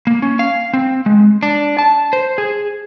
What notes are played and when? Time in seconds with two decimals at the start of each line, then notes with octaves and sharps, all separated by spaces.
0.07 A#3
0.22 C#4
0.39 F5
0.74 C4
1.06 G#3
1.43 D4
1.78 A5
2.13 C5
2.38 G#4